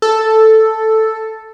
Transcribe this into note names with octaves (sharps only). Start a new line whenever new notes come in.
A4